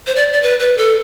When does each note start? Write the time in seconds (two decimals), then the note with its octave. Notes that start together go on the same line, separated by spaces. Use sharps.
0.07 C5
0.16 D5
0.33 D5
0.42 B4
0.59 B4
0.78 A4